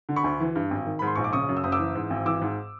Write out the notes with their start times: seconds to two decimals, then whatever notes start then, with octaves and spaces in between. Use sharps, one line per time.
0.09 D3
0.16 B5 C#6
0.24 D2
0.40 E3
0.56 G2
0.71 G#1
0.86 D#3
0.99 G#2 B5
1.07 C6
1.16 A#1 C#6
1.24 D6
1.33 C#3 C#6 D#6
1.49 F#2
1.57 E6
1.63 F#1 D#6
1.72 D6 E6
1.79 E3
1.95 G#2
2.10 G#1
2.25 E3 D6 E6
2.42 G#2